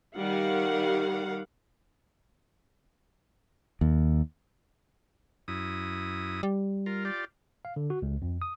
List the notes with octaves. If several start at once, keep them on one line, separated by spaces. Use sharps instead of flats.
D#3 G3 F5 F#5
D#2
F#2 E4 D#6
G3
F4 A#4
F4 G4 D5
F5
D3
F#4
C#2
F2
D#6